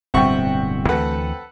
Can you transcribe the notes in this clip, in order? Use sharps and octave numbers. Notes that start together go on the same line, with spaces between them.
D1 G2 B2 C4 E5 F#5 G5 C#6
D2 E3 A3 A4 B4 F#5